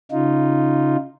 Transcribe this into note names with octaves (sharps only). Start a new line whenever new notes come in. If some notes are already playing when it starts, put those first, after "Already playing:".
C#3 D#4 F4